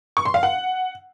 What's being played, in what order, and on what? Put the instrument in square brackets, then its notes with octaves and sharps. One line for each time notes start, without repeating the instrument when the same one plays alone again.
[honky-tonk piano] C#6
C6
F5
F#5